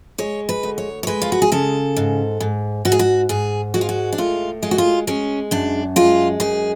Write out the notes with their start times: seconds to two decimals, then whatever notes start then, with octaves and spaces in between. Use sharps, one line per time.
0.18 G#3 C#5
0.49 B4
0.63 D2
0.78 C#5
1.03 C#5
1.07 G#3 B4
1.22 F4
1.32 F#4
1.42 G#4
1.52 C#3 A4
1.97 G#2
2.40 G#2
2.85 G#2 F#4
2.92 G#4
2.99 F#4
3.29 G#2 G#4
3.74 G#3 F#4
3.81 F4
3.89 F#4
4.13 D4
4.18 A2 F4
4.63 G#3 F4
4.71 F#4
4.78 F4
5.07 G#3 C#4
5.51 F#2 D4
5.96 G#3 F4
6.40 F#2 G#4